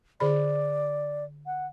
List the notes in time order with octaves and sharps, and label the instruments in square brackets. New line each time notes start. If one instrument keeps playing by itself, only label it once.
[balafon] D3 G#4 B5 [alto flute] D5
[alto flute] F#5